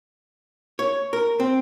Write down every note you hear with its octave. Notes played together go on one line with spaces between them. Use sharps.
C#5
A#4
C4